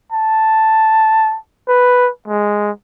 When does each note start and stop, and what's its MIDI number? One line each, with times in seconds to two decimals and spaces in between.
0.12 1.37 81
1.68 2.10 71
2.28 2.71 56